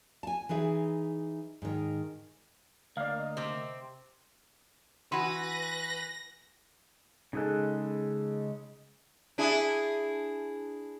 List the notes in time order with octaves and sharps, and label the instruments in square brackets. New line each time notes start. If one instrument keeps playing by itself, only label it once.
[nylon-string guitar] G#5 A5
E3 D#4 G#4 E5
G#2 D#3
[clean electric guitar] D2 [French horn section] A#3 D#5 [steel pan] D5 F5
[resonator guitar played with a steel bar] C3 C4
[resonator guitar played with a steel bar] E3 F#4 [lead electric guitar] B4 [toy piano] B5 C6 [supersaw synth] A#6
[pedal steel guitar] C#3 G#3 F#6 [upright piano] D#4 G#4 A4
[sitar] D4 E4 G#4